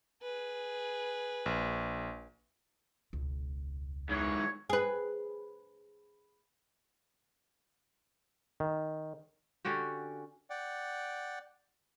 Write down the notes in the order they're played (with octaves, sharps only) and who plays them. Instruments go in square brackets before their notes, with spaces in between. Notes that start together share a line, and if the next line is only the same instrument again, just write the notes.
[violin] G#4 B4
[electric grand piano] A#1
[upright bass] E1 C#2
[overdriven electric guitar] G#2 E3 [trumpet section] C#5
[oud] G#4 B4
[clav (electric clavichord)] D#3
[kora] D3 C#4 F#4 G4
[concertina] D5 F#5 G5